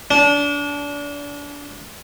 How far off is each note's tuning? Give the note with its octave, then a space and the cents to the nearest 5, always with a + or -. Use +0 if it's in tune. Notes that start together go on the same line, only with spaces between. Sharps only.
D4 -30